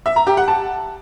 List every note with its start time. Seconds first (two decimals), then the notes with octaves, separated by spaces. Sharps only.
0.06 E5
0.16 A#5
0.27 G4
0.37 F#5
0.48 A5